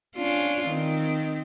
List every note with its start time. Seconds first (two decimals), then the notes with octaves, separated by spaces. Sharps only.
0.16 C#4 D4 F4
0.69 D#3 C4